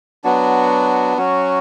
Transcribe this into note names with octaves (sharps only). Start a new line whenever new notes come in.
F#3 B3 D4 F#4
F#3 C#4 F#4